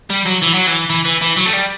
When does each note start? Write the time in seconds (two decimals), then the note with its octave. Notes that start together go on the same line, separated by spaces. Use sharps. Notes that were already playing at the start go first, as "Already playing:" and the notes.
0.10 G3
0.26 F#3
0.42 E3
0.54 F#3
0.67 E3
0.90 E3
1.05 E3
1.22 E3
1.37 F#3
1.46 A3
1.54 G3